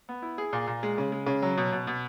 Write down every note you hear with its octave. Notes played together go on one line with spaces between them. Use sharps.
B3
E4
G#4
A#2
A#2
G#3
C#3
G#3
C#3
F#3
B2
B2
B2